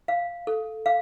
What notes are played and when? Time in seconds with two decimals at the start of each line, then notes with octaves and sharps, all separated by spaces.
0.08 F5
0.47 A4
0.86 F5